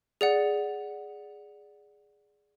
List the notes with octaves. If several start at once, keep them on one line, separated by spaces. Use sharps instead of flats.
G#4 D5 F#5